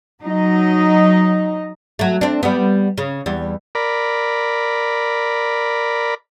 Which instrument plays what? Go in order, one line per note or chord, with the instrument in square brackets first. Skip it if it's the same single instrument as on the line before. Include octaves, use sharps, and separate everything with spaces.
[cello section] F#3 D#4 D#5
[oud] F#3 A3
C4 D4
G3 B3
C#3
E2 G3
[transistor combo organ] A#4 D5 B5